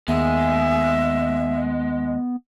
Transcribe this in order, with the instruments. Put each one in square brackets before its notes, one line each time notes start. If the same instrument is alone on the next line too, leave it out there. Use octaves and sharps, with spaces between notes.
[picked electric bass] D#2 [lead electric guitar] G#3 [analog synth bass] B3 [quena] E5